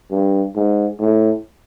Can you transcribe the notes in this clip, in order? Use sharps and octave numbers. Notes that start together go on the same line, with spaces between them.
G2
G#2
A2